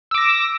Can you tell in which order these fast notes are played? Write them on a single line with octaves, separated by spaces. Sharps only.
E6 D6 A#6